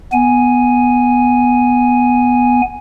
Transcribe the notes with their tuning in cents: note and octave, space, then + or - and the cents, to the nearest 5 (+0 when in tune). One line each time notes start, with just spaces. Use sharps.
B3 +0 G#5 +0